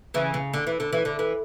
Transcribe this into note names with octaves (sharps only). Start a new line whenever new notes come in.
C#3 E3
C#3
D3
E3
D3
E3
D3
E3